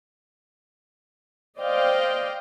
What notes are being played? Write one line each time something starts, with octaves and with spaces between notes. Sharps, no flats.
C5 D5 D#5 F5 G5